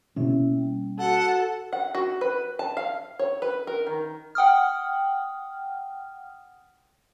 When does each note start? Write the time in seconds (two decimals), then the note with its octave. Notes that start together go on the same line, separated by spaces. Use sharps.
0.16 B2 A#3 C#4 E4 E5
0.55 G3
0.99 F#4 A4 F#5
1.73 F#5
1.95 F#4
2.21 B4
2.59 A5
2.77 F5
3.19 C#5
3.42 B4
3.67 A#4
3.87 D#3
4.35 F#5 G5 D#6 F6